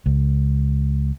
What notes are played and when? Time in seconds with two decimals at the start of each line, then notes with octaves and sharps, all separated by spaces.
0.06 C#2